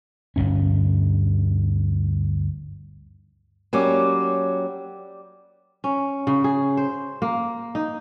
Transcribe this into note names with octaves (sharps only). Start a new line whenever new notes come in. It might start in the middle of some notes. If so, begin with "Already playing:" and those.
G1 D2 G2 C#4
F#3 G3 A#3 C#4 D6 E6
C#4
C#3
G#4
C5
A#3
D#4